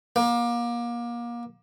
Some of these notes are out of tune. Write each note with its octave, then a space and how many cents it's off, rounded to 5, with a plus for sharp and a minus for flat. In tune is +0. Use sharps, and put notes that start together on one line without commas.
A#3 +30